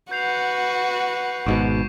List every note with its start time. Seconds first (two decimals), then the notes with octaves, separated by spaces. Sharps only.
0.11 F#4 B4 F#5 G6 C7 F7
1.46 G#1 G#2 B2 C#6 D6 D7